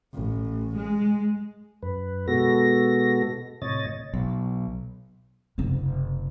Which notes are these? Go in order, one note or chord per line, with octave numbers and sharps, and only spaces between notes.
A1
G#3
F#2 B4
B2 G#3 B3 F#4 A4 A#6
A2 C3 C#5 D#5 A6
B1
F#1 C3